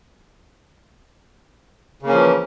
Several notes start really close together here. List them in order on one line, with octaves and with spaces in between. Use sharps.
C#3 A#3 C#4 F3 E3